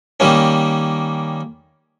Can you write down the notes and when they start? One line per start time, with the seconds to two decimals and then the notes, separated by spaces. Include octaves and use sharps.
0.20 D#3 G3 A#3 C#4